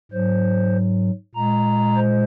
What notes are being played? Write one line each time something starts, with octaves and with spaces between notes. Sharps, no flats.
G#2 F#3 C5
A#2 G#3 A#5
C5